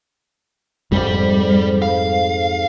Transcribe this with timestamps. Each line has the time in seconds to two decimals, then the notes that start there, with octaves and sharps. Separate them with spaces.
0.92 F2 G#2 G3
1.82 F5